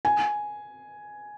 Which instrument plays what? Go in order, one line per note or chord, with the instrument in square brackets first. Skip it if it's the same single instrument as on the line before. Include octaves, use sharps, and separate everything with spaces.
[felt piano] G#5